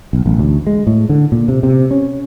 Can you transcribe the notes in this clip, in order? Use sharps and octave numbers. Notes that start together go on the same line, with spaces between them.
B1
A1
D2
G#3
A2
D3
A#2
C3
C3
C#4